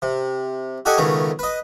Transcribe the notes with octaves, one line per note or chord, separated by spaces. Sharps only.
C3
F#4 G4 A4 D#5 F#5 G#5
C#2 B2 D#3 A3 C#4
B4 D#5